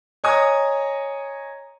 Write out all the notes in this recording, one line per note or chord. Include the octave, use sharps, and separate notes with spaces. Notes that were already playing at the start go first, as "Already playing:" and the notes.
C#5 D#5 G#5 A#5 D#6